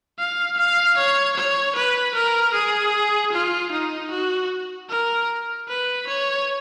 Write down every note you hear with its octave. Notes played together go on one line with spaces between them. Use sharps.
F5
F5
C#5
C#5
B4
A#4
G#4
F4
D#4
F#4
A#4
B4
C#5